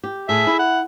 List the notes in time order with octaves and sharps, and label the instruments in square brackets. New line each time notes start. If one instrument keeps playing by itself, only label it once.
[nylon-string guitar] G4
[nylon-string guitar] A2 [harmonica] G#4 E5
[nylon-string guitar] E4
[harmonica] F#5